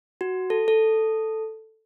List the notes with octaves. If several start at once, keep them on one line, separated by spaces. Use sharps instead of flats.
F#4
A4
A4